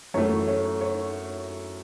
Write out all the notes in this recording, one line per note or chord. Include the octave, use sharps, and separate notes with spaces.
F#2 E3 A3 C#5
C#5
C#5